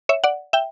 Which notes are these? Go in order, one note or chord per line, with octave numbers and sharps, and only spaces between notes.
C#5 E5
D5 F#5
E5 G5